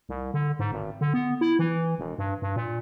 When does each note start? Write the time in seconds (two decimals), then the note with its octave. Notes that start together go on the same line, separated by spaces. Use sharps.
0.09 C2
0.34 D3
0.59 G#2
0.72 G#1
1.01 D3
1.14 B3
1.41 E4
1.59 E3
1.99 E1
2.18 G2
2.42 G2
2.56 A#2